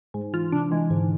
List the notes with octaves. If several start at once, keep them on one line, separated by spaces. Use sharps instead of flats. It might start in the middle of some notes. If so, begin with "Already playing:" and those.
G#2 G#3
E3 F4
C3 D4
E3 G#3
G#2 D3